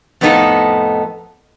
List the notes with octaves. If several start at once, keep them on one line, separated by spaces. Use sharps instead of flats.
F2 A2 B3 D#4 A4